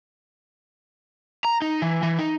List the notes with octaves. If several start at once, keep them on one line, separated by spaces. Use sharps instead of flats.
A#5
D#4
E3
E3
D#4